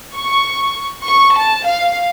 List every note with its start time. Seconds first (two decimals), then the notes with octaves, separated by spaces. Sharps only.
0.16 C#6
1.06 C#6
1.35 A5
1.66 F5